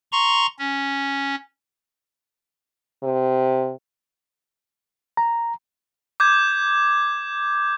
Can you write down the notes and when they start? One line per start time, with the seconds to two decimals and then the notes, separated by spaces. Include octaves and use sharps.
0.12 A#5 C6 C#6
0.59 C#4
3.03 C3
5.17 A#5
6.20 D6 G6 G#6